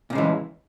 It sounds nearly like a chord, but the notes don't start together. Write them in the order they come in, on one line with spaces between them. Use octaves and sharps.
A#2 C#3 G#3 E3